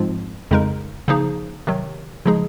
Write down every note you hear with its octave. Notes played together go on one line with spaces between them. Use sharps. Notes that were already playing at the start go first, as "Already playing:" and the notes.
Already playing: G#2 F3 G#3 C4 F4
F2 C#3 G#3 D#4 A#4
C#3 F3 A#3 D#4 G#4
C3 D#3 F#3
C#3 F3 G#3 D#4 G#4